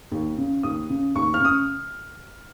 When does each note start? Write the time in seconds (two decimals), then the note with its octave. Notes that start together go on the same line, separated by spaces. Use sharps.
0.12 D#2
0.38 C#3
0.63 D#2 D#6
0.90 C#3
1.15 D#2 C#6
1.34 F6
1.40 C#3 D#6